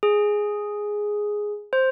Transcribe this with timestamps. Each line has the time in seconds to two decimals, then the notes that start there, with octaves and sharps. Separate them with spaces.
0.03 G#4
1.73 C5